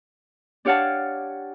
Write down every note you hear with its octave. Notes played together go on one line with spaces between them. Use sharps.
D4 G4 C#5 F5 F#5 A5